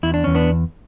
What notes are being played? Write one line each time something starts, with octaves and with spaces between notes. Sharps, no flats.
E2 E4
D4
E2 C#4
B3 D4